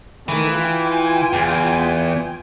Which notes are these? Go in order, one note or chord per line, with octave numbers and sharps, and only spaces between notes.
D#3 E3 A3
F4 G5 G#5
E2